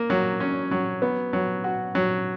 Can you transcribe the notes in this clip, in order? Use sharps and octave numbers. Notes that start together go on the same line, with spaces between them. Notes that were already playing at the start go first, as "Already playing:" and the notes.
Already playing: A#3
F#3
C#4
F#3
B3
F#3
F#4
F#3